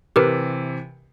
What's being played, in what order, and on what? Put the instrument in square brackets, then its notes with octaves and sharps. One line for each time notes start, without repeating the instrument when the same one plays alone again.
[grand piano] C3 E3 [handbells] G4 A#4 B4